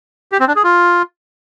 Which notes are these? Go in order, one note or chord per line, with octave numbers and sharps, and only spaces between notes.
G4
C4
D4
G#4
F4